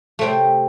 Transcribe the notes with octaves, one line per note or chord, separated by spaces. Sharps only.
C3 A3 C4 G5